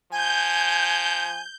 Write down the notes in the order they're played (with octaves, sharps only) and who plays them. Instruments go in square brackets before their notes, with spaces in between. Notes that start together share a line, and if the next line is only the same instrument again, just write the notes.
[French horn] F3 [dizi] G#5 [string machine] G6